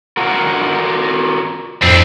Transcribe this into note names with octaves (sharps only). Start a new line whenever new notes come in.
F4 F#4 A#4
F2 A2 C4 D4